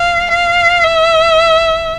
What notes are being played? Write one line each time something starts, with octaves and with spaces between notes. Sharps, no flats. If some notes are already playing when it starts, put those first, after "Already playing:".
Already playing: F5
F5
E5